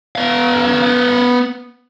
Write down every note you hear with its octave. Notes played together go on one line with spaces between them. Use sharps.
B3 F5